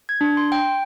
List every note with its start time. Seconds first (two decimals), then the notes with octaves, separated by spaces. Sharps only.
0.09 G#6
0.21 D4
0.37 C6
0.52 G5